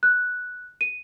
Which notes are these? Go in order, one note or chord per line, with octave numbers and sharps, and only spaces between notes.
F#6
D#7